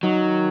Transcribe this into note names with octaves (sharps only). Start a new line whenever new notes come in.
D#3 F#3